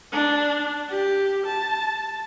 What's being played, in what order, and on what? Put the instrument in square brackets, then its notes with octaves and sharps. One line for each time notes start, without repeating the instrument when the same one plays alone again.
[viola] D4
G4
A5